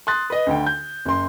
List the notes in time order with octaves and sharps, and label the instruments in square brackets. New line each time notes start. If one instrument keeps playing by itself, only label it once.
[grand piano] C6 D#6 F#6 A6
B4 D#5
D2 D3 G5
G6
F#1 C6